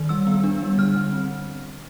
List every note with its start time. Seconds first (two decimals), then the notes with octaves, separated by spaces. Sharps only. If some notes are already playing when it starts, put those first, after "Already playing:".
Already playing: D#3
0.09 G3 E6
0.27 B3
0.44 D4
0.62 G3
0.78 D3 F6
0.96 G3
1.12 C4